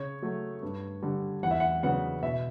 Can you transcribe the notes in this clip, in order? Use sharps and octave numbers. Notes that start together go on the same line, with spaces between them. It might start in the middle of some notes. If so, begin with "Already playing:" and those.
Already playing: C#3 C#5
F#3 A3
G2
D3 G3
E2 F#5
E5
F#5
C#3 F#3 B3 D4 F#5
B2 E5